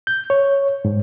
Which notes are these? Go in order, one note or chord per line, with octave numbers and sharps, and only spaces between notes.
G6
C#5
G#2